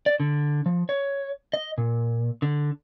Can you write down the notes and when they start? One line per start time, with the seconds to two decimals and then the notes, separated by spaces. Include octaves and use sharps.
0.06 D5
0.20 D3
0.66 F3
0.89 C#5
1.53 D#5
1.78 A#2
2.42 D3